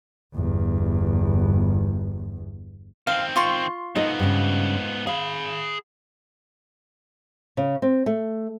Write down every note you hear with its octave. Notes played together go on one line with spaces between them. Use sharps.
G1 E2
D#3 C4 F5
F4 C6 C#6
G#2 B3 D#4 A4 D#5
G2 C#3
G#4 F5 B5
C#3
C4
A3